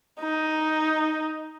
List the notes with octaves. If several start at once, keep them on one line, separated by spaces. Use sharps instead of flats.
D#4